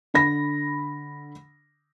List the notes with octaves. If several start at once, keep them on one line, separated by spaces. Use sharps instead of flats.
D3 B5 A#6